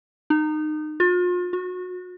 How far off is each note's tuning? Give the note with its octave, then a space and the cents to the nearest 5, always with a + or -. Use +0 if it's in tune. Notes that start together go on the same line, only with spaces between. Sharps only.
D#4 -25
F4 +40
F#4 -30